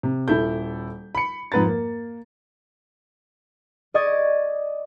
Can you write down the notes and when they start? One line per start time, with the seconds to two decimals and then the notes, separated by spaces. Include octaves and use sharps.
0.03 C3
0.28 D#1 E4 A4 G6
1.15 B5 C#7
1.52 F2 G#2 B4 A#5 A6
1.66 A#3
3.94 D5 D#5 C#6 D#6 G#6 A6